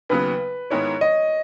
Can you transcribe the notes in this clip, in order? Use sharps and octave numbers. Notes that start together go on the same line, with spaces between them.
D#2 C#3 F#3 B3 B4
G#2 D#3 G#3 B3 E4 C#5
D#5